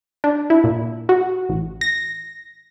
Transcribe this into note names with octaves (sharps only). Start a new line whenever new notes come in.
D4
E4
A#2
F#4
A1
A#6